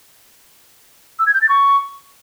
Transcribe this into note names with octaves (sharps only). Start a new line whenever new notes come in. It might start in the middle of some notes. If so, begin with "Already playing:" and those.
E6
G#6
G6
A6
C#6